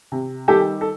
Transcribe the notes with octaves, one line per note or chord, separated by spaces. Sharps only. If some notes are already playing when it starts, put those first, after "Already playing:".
C3
D#3 G3 G4 A4
A4